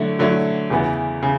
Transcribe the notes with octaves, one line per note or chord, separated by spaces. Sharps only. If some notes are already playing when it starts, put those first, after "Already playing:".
Already playing: D3 F#3 A3 E4
D3 F#3 A3 E4
E2 C#3 E3 B3 E4
C#3